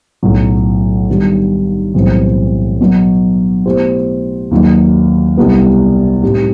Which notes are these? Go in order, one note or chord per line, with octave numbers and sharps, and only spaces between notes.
B1 A2 F#3
G2 D#3 G3 B3
B1 A2 E3 G3 C4
B2 F#3 B3
B2 A3 E4 G4 C5
D#2 D#3 F#3
C2 B2 G3 B3
A2 G3 C4 D#4 G4